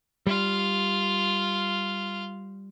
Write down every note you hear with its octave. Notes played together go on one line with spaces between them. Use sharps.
G3 F4 F5